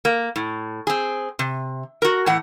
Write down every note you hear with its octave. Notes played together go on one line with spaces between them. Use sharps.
A#3
A2
C4 G#4
C3
F#4 A#4
A2 E3 F#5